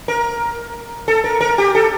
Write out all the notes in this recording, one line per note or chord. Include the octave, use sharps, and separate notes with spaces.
A#4
A4
A#4
A#4
G4
A4